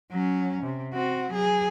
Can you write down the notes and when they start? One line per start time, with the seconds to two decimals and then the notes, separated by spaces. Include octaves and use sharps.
0.12 F#3 C#4
0.63 C3
0.94 C4 F#4
1.33 F#3 G#4